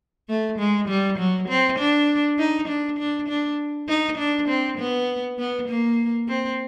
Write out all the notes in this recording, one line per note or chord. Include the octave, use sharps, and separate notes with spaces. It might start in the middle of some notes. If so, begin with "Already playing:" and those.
A3
G#3
G3
F#3
C4
D4
D#4
D4
D4
D4
D#4
D4
C4
B3
B3
A#3
C4